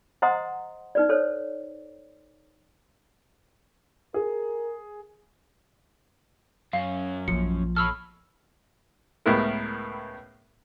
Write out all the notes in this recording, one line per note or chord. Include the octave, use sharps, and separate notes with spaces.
C5 D#5 F#5 A#5 C6 D#6
D#4 B4 D5
A4 C5 C#5
G#4 A#4
F#2 C#4 F5
A#1 A#2 F3 C#7
A4 C#5 B5 E6 F6
C#2 A2 B3 E4 A#4